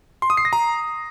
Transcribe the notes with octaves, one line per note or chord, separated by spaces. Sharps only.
C6
D#6
C7
A#6
A#5